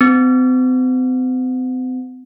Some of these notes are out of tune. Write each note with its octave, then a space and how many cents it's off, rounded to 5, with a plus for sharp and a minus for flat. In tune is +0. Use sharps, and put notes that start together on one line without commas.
C4 -40